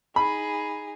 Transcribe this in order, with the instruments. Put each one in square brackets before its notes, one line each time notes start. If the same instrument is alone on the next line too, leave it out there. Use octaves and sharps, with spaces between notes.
[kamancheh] D#4 G#4 [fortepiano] B5